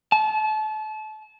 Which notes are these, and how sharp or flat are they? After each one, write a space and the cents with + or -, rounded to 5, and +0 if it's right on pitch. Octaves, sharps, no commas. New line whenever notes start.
A5 -30